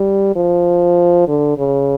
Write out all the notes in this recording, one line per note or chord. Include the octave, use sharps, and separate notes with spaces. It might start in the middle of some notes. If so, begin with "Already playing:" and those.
Already playing: G3
F3
D3
C#3